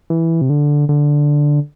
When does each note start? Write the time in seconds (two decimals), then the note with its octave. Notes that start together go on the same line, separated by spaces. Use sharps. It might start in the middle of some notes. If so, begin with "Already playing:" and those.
0.10 E3
0.41 C3
0.50 D3
0.89 D3